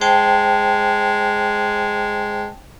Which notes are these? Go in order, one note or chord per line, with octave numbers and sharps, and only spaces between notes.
G#3 C5 G5 A5